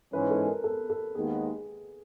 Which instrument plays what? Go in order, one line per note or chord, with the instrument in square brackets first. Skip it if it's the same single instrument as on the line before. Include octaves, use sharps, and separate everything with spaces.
[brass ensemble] G#2 E3 G#3 C#4 [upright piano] B4
[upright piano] A4
A#4
A4
A4
[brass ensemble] D#2 D#3 G#3 B3 [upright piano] G#4